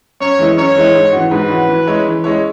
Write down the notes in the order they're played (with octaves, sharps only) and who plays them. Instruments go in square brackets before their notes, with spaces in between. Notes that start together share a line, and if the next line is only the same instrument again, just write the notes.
[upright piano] F#2 [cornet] C#5
[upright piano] E3 G#3 E4
[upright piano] F#2 [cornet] C#5
[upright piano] E3 G#3 E4
G#2
E3 C#4 F#4
[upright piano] G#2 [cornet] B4
[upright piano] E3 C#4 F#4
E3
G#3 C#4 E4 C#5
E3
G#3 C#4 E4 C#5